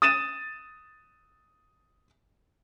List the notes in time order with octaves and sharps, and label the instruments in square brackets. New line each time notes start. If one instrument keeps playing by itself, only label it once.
[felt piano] D#6 A6 D#7 E7